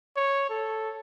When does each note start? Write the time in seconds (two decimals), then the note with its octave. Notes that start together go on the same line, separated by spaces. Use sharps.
0.16 C#5
0.50 A4